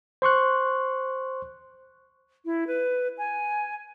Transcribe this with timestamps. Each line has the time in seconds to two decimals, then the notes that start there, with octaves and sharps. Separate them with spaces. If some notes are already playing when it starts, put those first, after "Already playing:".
0.22 C5 C6 C#6 F#6
2.45 E4
2.67 B4
3.18 G#5